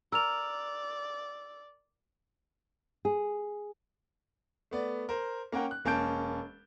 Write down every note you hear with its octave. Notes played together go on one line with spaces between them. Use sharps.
A#4 D5 E6 F7
G#4
A3 B3 D5
A#4 C5
A#3 C#4 A#4 F#5 G5
F#6
E1 A#3 C#4 A5 G6 D7